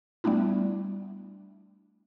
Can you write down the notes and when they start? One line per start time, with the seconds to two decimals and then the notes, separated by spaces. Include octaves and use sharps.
0.24 G3 A3 B3 D4 E4